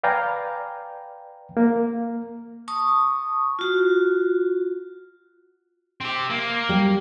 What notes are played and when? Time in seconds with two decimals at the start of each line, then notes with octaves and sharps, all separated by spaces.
0.03 B4 D5 F5 G5 G#5 A#5
1.57 A#3
2.68 A5 C#6 D#6
3.59 F4 F#4
6.01 C4 G4
6.30 A#3
6.69 G3